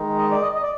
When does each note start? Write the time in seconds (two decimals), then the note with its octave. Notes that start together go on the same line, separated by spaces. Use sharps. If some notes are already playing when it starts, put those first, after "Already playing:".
Already playing: D#3 G#3 D#4
0.18 D#5
0.31 D5
0.42 D#5
0.55 D#5
0.63 D5